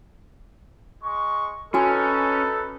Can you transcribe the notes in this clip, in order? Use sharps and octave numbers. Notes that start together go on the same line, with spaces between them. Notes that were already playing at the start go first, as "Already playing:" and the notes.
G#3 C#6
C#4 D#4 F#4 A4 B4 G#5